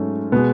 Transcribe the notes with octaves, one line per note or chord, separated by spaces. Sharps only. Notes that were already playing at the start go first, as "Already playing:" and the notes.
Already playing: G#2 F#3 A3 C#4
B2 G#3 B3